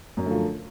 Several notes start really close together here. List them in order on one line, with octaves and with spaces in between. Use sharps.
F#2 D3 A3 F3